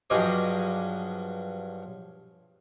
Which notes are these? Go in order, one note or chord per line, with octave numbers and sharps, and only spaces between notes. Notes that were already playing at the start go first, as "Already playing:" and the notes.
G2 F3 F#3 G#4 D#5 D6